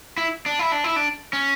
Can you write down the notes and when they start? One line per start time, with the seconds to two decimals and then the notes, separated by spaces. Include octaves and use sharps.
0.18 E4
0.46 D4
0.59 E4
0.72 D4
0.84 E4
0.96 D4
1.33 C#4